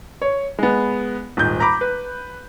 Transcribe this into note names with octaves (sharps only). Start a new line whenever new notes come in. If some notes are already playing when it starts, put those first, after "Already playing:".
C#5
G#3 B3
D#1 G#2 G6
A#5 B5 D6
B4